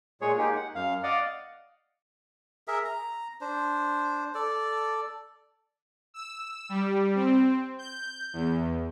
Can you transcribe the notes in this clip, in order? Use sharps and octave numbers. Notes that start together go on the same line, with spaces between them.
A#2 G#3 G#4 C#5
G#3 A#3 D#4 G4 G#4
F#5
F#2 F5
D5 D#5 F5 F#5
G#4 A#4 E5
A#5
D4 C5
A4 D5
E6
G3
C4
G6
E2